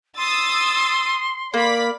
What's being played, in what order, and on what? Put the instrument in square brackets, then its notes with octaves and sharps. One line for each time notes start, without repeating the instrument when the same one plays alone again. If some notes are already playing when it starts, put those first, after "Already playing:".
[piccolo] C6 [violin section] D#6 E6 A6
[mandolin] A#3 [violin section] D5 B5 B6